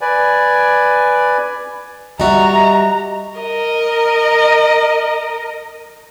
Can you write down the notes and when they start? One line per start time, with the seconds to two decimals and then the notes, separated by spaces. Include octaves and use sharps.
0.01 B4 D5 G#5
2.20 G3 F#4 D#5 E5 A#5
3.38 A#4 D#5